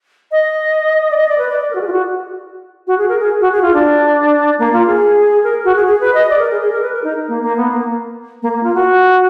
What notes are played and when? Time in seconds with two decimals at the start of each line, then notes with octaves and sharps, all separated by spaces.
0.32 D#5
1.11 D5
1.17 D#5
1.29 D5
1.38 B4
1.49 D5
1.60 D5
1.71 A#4
1.75 F#4
1.81 G#4
1.87 F4
1.92 F#4
2.87 F#4
2.98 G#4
3.09 A#4
3.20 G#4
3.41 F#4
3.52 G#4
3.62 F4
3.74 D4
4.59 A#3
4.73 F4
4.87 G#4
5.44 A#4
5.65 F#4
5.76 G#4
5.86 G#4
6.01 B4
6.14 D#5
6.30 D5
6.39 A#4
6.51 G#4
6.61 G#4
6.72 A#4
6.82 B4
6.93 A#4
7.04 D#4
7.28 A#3
7.43 A#3
7.57 B3
7.71 A#3
8.43 A#3
8.53 A#3
8.63 F4
8.74 F#4